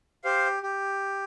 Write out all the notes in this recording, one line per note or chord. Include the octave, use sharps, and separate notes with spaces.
G4 C5 F5
G4